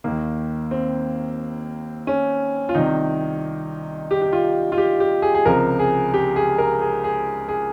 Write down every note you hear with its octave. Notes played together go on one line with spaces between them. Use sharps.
D#2 D#3 A#3
C4
C#4
F4
C2 C3 D#3 D#4
G4
G4
F4
F4
G4
G4
G#4
G#4
C#2 C3 F3 A#4
G#4
G4
G#4
A#4
G#4
G#4
G#4